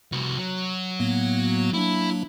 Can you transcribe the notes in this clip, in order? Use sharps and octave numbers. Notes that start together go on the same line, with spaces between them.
C2 F#4
F#3
A2 A#3 B3
F#3 A#3 D4 E4